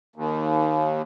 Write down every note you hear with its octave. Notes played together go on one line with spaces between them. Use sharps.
D#2